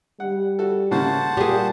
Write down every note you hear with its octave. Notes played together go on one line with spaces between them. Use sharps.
G3 F#5
F#4 A4
A2 C#3 A#3 C5 F#5 A5
A#2 G3 G#4